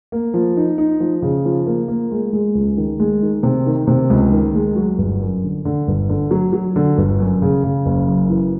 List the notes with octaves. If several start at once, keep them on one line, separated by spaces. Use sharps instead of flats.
A#3
F3
D#4
D#4
F3
C#3
F3
A#3
A#3
G#3
G#3
C#2
D#3
G#3
D#3
C3
D#3
C3
C#2
D#3
G#3
F#3
G1
F#2
D3
D3
G1
D3
F#3
F#3
D3
G1
F#2
C#3
C#3
F#1
F#2
E3